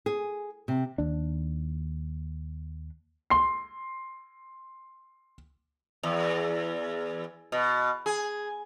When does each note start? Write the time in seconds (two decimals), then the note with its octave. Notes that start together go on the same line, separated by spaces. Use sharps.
0.06 G#4
0.68 C3
0.98 D#2 D4
3.30 C6 C7
6.03 E2
7.52 B2
8.06 G#4